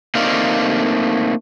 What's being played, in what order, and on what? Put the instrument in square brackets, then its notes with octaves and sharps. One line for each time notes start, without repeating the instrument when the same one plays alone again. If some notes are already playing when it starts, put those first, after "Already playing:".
[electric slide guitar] A3 A#3 C4 D#4 D5 F5